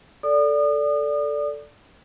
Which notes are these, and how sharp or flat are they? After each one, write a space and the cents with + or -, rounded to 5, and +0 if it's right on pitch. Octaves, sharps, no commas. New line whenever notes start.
A4 +0 D5 -10 D#6 -40